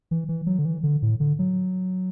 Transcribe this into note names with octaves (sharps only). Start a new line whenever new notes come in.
E3
E3
F#3
D3
E3
D3
A2
D3
F#3